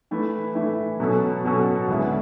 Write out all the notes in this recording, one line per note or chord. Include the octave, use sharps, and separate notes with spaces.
E3 A3 E4 B4
E3 A3 E4 B4
B2 F#3 C#4 F#4 A4
B2 F#3 C#4 F#4 A4
D2 D3 G#3 B3 E4